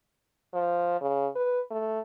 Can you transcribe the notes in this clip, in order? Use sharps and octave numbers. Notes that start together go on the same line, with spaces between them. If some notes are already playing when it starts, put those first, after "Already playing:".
F3
C#3
B4
A3